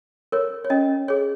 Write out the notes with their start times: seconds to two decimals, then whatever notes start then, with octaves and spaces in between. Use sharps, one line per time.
0.32 A#4 C#5
0.65 C#5
0.70 C#4 D#5
1.08 G#4 C#5